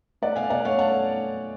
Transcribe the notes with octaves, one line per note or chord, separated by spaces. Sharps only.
A3 D5 F#5
B2 F5 G#5
B2 D5 F#5
A3 C#5 F5
A3 F#5 A5